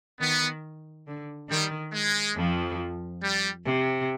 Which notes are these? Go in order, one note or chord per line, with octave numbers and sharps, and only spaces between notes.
D#3 B3
D3
D#3 G3
G#3
F2 F3
G3
C3